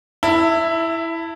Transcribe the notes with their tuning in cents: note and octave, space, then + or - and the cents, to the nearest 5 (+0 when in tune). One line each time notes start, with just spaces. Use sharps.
E4 +0 E5 +30 A5 +35